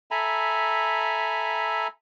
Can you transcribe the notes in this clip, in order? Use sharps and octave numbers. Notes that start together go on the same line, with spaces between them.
A4 E5 G#5 A#5 B5